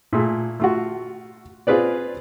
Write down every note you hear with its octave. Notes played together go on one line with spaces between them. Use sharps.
A#2 A3 G#4
A3 F4 F#4
C4 F4 G#4 B4 D5